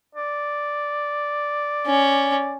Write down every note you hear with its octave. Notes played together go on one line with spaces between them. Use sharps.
D5
C#4